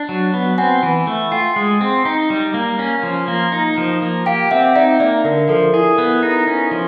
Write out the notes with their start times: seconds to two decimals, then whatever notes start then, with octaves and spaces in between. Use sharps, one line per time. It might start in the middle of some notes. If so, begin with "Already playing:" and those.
Already playing: D4
0.09 F#3
0.34 B3
0.58 C4 F#5 G#5
0.83 E3
1.07 A3
1.31 F4 F5 G5
1.56 G#3
1.81 C4
2.05 D#4
2.30 G3
2.54 A#3
2.79 C#4
3.03 F3
3.28 A#3
3.52 D#4
3.78 F3
4.02 A#3
4.26 G4 F5 G5
4.51 C4 E5 F#5
4.75 D#4 D5 E5
5.00 A#3 D5 E5
5.24 D3 A#4
5.42 A#4
5.49 F3 A4
5.74 E4 G#4
5.98 B3
6.23 D#4
6.47 C#4
6.71 F3